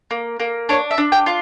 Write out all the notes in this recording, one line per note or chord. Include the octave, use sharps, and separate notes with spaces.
A#3
A#3
D4 C#5
E5
D4
G5
F4